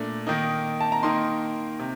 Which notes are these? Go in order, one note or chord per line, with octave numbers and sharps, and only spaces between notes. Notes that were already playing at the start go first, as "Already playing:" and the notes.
Already playing: A#2 A3 D4
D#3 A#3 D#4
A5
A#5
D#3 A#3 D#4 C6
C3